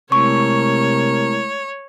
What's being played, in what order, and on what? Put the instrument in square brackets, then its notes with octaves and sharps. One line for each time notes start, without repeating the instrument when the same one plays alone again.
[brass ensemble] C3 A#4 [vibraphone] G#3 A3 E4 [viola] C#5 [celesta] C#6